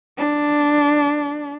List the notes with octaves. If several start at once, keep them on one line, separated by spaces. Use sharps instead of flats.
D4